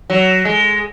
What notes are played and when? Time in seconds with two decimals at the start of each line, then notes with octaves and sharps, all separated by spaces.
0.10 F#3
0.45 G#3